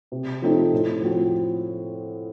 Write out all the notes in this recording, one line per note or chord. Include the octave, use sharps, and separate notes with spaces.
C3
F3 A3 C4 D#4
A2
F3 C4 F#4